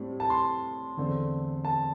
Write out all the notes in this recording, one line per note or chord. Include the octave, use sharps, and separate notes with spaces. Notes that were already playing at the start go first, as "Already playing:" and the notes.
Already playing: A2 G3 C4
A5
C6
E2 D3 A3 C4
A5